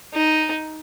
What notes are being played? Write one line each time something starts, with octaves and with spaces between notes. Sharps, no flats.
D#4